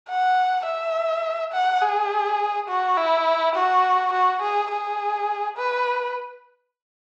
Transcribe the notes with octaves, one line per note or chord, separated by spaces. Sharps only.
F#5
E5
F#5
G#4
F#4
E4
F#4
F#4
G#4
G#4
B4